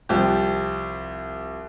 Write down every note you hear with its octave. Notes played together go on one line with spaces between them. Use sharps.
C2 F3 G4